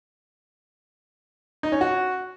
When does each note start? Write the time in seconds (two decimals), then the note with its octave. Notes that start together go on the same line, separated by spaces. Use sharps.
1.63 D#4
1.72 C#4
1.81 F#4